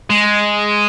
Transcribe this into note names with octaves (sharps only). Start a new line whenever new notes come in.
G#3